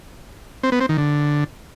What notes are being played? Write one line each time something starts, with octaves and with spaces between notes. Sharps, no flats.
C4
B3
C4
D#3
D3